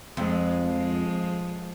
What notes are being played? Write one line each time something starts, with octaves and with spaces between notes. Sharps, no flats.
F2 F3 G#3
F3 G#3